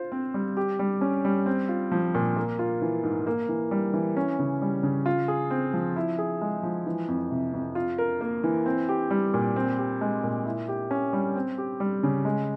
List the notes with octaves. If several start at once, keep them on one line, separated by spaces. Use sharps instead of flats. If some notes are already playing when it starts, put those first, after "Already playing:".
Already playing: F4 C5
C4
G3
G4
G3
C#4
G3
C4
F4
F3
A#2
A#3
F4
E3
G#2
A#3
E3
G3
E3
C#4
C#3
G3
C#3
F4
G#4
C4
F3
E4
G#4
G#3
F3
E3
F2
C3
F2
F4
A#4
A#3
E3
C4
G4
G3
A#2
C4
G4
G#3
A#2
E4
G4
C#4
G3
C4
G4
G3
C#3
G#3